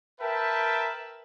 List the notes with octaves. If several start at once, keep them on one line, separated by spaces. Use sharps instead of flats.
A#4 B4 E5 G5 A5